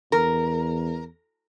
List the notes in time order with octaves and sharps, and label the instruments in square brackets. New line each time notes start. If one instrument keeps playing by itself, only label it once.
[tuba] E2 [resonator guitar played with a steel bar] A#4